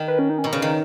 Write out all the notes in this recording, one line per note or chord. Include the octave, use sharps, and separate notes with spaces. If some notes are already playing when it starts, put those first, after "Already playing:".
Already playing: D#3
B4
C#4
D#4
C#4
B2 D#4
C#3
D#3